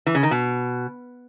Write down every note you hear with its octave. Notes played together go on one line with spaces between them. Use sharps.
E3
C#3
D#3
B2